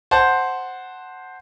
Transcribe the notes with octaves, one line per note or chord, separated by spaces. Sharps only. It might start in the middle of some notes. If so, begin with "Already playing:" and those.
C5 F#5 A5